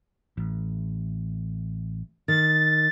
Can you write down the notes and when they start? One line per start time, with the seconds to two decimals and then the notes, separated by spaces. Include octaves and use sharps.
0.37 A1
2.28 D#3 A6